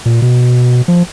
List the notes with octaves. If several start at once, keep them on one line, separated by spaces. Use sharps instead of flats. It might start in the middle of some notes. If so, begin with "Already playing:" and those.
A#2
B2
F3